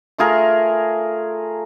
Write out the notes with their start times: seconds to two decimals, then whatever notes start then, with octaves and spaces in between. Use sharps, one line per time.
0.18 A3 F4 G#4 A#4